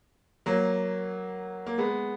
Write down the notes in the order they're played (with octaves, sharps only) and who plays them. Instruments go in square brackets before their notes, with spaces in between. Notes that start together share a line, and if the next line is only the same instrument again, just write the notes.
[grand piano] F#3 A#3
A#3
G#3 B3